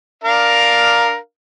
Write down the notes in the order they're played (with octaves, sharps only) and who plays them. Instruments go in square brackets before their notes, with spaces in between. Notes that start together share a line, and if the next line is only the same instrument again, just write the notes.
[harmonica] D4 A#4 F5